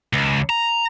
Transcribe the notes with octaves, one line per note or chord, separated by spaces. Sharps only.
C#2
A#5